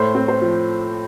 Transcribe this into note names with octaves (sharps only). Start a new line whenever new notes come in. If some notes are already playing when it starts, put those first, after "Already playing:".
Already playing: A2 A3 C5
C4
C5
F3